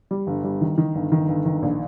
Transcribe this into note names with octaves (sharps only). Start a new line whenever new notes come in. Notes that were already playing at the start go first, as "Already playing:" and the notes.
G3
G1
G3
D#3
D#3
G1
D#3
G1
D#3
A#1